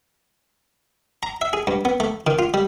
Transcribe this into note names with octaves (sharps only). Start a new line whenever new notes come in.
A#5
E5
G#4
G2
B3
A3
D#3
F4
G3